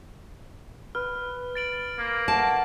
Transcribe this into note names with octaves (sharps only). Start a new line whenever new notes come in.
B4 F6
A6 D7 F#7
A#3
A3 F#5 A5